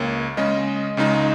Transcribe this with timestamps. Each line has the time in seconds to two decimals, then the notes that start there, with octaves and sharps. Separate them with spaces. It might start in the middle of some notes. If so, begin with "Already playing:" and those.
Already playing: C#2 A#3 C#5
0.37 C#3 G#3 C#4 D#5
0.97 C#2 C#3 G#3 D#4